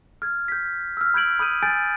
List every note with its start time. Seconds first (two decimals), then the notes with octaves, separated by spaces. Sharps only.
0.22 F6 G#6
0.48 G6 B6
0.97 E6 F6
1.14 B5 G6 G#6 D7 F#7
1.39 B5 D#6 F6 G6 D#7
1.62 G#5 F6 G6 A6 D7